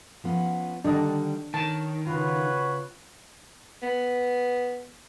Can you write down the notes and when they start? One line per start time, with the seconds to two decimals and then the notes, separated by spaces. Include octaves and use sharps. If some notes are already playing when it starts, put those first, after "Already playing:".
0.24 F3 B3 C#4
0.85 D3 D#3 G3 D4 D#5
1.54 D#3 C#5 A5
2.06 C#3 F4 F#4 B4 C#5
3.82 B3